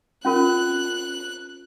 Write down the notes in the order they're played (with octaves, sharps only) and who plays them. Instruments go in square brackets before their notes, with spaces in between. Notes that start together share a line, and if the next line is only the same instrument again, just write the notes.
[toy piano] C#4 F4 A#4 [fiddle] F#6